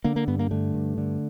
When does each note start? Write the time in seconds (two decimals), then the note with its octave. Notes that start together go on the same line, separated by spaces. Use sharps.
0.04 D3 A#3
0.16 A#3
0.28 G2 B3
0.39 A#3
0.51 D3 A3
0.74 G2
0.98 D3